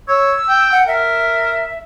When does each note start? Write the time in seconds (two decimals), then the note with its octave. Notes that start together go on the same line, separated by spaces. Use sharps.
0.08 C#5 E6
0.49 G5
0.72 F#5
0.88 A#4 E5